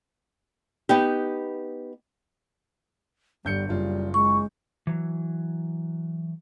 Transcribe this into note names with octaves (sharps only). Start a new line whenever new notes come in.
B3 D#4 G4
G1 G3 G6 C#7
F#1 G3 F4
G#3 C#6
E3 F#3